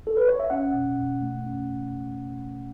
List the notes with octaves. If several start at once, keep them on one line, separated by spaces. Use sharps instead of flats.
A4
B4
C#5
E5
C#4 F#5
B2
B2
A3
C#4